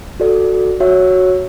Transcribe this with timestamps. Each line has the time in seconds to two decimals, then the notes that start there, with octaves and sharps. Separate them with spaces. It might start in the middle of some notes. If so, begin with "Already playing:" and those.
0.20 F#4 A4 D5
0.80 F#4 C#5 E5